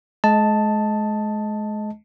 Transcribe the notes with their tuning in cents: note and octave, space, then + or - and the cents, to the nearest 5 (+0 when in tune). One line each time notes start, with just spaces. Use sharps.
G#3 +35 D#5 +15 A5 +0